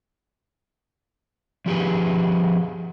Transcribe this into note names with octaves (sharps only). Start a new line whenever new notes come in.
F3 G4 G#4 B4